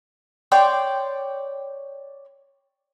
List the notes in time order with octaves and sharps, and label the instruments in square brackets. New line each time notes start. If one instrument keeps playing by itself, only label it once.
[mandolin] C#5 D5 G5 C6